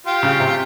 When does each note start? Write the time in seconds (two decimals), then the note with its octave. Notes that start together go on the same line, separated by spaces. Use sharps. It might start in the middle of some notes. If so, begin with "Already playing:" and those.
0.06 F4 G4
0.23 C#3
0.40 C3
0.46 F4